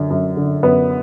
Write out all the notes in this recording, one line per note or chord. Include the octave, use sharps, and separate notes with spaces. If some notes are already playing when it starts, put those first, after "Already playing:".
Already playing: F#2 D3
F#2
D3
F#2 B3